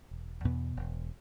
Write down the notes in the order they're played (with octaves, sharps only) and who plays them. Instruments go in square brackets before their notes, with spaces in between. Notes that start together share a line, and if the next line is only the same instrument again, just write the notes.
[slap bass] E1
E2 B2 B3
E1